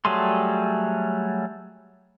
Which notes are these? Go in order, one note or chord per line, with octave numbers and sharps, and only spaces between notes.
F#3 G3 A3 G#4 C6